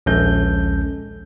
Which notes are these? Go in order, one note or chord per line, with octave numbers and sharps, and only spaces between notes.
A#1 D#2 G#3 C#4 A4 G6